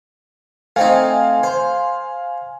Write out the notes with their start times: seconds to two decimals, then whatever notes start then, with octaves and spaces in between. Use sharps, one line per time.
0.76 A3 C4 D#4 F5 G#5
1.43 C5